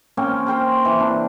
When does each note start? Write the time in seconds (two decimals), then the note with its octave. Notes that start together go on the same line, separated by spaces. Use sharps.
0.17 A#3 C4 C#4 G5
0.46 C5 G5 A#5
0.85 E3
1.00 C3 D4